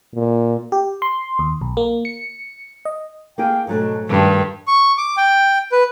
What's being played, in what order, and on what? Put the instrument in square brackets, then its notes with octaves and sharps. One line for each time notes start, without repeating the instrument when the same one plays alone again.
[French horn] A#2
[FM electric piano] G4
C6
D#2
B1
A#3
C#7
D#5
[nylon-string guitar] A#3 E4 G#4 [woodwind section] F5 G5
[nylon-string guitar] G#2 F#3 A3 [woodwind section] B2 D4
[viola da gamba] G2 [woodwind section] D#3
[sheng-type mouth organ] C#6
D6
G5
B4